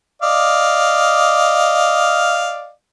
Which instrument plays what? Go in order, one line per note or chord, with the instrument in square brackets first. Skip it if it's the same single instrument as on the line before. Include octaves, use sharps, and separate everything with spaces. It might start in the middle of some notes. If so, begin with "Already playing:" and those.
[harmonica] D5 D#5 F5